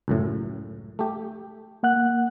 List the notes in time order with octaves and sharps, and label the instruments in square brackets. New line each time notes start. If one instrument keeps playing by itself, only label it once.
[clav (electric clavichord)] C#2 F#2 A2
A3 G4
[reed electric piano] A#3 F#5 F#6